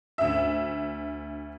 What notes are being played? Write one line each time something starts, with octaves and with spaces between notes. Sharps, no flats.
D2 E5